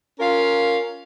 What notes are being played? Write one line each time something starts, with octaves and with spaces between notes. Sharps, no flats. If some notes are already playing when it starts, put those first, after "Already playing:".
C#4 F4 A#4 F5